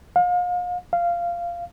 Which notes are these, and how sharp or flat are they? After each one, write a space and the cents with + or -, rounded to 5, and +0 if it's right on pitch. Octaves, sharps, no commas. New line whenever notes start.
F5 +35
F5 -15